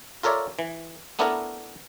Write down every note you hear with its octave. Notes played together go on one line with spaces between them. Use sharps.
F4 A4 A#4 C#5 D5 E5
E3
A3 B3 D4 E4 A4 A#4